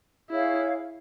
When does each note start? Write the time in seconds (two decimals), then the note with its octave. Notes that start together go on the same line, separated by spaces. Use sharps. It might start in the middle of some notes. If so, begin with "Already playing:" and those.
0.30 E4 G#4 C#5 F5